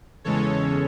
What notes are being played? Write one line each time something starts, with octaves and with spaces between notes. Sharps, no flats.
E2 C#3 E3 G#3 C#4 A4 C#5